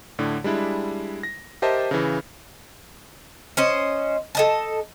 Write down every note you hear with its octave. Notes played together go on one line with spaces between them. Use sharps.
A2 D3
G3 G#3 D4 E4
A#6
G4 A#4 C5 D#5 E5 A5
C#3 E3
C#4 C5 D#5
A4 D#5 A5